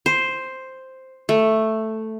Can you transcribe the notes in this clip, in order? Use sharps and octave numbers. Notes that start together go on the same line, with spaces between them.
C5
A3